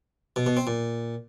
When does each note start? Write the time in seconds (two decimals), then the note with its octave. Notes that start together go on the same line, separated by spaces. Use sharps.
0.36 B2
0.47 B2
0.57 C4
0.67 A#2